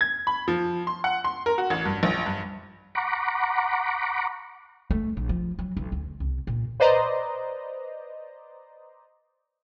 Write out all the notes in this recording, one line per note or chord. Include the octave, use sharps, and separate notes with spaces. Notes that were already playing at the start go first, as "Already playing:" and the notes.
G#6
B5
F3
C6
F#5
C6
A#4
F#4
A1
G2
A#1
G2
F#5 A#5 B5 C#6 D6
A3
A#1
F3
F#3
B1
D2
C2
A#2
B4 C5 D5 D#5 A#5